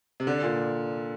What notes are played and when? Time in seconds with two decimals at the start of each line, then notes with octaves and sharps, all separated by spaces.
0.20 C3
0.27 D3 D4
0.43 A#2